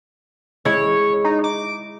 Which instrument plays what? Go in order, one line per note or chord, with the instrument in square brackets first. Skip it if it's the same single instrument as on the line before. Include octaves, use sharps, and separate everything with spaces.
[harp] G#3 E4 [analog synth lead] C#5
[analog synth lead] D#4
D6